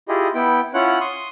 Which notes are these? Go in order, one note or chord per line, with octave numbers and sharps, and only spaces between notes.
E4 F4 G4 G#4 D#5
B3 E4 G5
C#4 E4 F4 C#5 F#5 F#6
C6 C#6 D#6